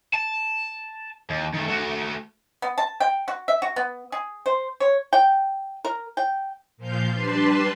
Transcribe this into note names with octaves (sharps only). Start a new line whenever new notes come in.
A5
D#2
D#3 A3
A3 F#4
B3
A5
G5
F#4
E5
F#4
B3
G#4
C5
C#5
G5
A#4
G5
A#2 F3 F5 G6
G3 D4 B4 A5 C6